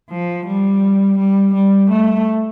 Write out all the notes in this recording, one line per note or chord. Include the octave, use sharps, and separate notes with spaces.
F3
G3
G3
G3
A3